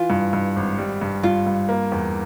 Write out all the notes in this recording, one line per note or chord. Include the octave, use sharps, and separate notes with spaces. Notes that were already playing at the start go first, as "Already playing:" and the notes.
Already playing: E3 F4
G2
G2
G#1
G3
G2
G2 F4
G2
A#3
E2